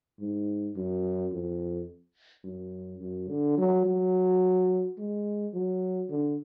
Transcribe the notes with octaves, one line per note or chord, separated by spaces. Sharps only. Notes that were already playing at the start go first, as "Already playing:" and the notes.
G#2
F#2
F2
F#2
F#2
D3
F#3
F#3
G#3
F#3
D3